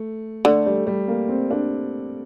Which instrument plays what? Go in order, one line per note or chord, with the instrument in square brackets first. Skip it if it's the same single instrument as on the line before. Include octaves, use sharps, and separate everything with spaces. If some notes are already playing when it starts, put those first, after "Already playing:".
Already playing: [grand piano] A3
[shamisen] D3 [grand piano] A3
[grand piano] G3
G3
A#3
C4
D4